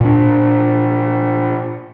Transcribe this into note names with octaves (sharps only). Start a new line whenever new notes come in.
A#2 D4